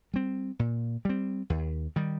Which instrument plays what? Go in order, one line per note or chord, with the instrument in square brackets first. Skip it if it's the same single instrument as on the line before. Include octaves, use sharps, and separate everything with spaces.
[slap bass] G3 C4
A#2
G3 C4
D#2
D#3 G3